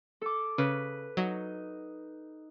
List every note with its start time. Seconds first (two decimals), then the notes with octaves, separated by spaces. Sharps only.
0.21 A4 D6
0.58 C#3 B4
1.17 F#3 D#4